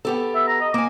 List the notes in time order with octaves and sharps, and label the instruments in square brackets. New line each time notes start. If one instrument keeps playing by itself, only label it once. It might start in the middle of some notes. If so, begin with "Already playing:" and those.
[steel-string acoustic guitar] B3 G4 A4
[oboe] E5
A#5
D#5
[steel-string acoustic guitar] A#3 G#5 [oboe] D6